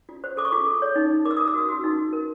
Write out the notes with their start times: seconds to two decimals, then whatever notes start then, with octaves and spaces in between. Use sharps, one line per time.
0.09 F4
0.24 C5
0.37 A4 D6
0.45 C#6
0.52 F4 D6
0.66 A4
0.82 C#5
0.96 D#4
1.11 D#4
1.25 A#4 D6
1.31 E6
1.37 A#4 D#6
1.48 E6
1.54 F#4 D#6
1.69 F#4 E6
1.84 D#4
1.97 F#4
2.13 A#4